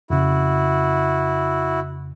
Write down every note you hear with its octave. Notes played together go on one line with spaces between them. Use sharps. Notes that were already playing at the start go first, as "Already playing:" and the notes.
F2 C#3 E4 F#4